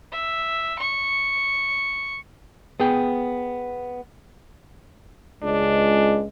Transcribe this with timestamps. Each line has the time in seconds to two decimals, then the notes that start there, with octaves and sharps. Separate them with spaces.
0.12 E5
0.79 C#6
2.80 B3 G#4 G5
5.43 C#2 G#3 D4